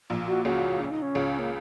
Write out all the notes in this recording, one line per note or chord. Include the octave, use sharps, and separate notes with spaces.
A#1 A#2
F#4
C#2 C#3 F#4
C#4
D#4
C#4
C#2 C#3
A#3